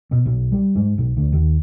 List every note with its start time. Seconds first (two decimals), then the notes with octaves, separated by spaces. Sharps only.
0.11 B2
0.25 B1
0.52 G3
0.75 G#2
0.98 B1
1.17 D2
1.33 D#2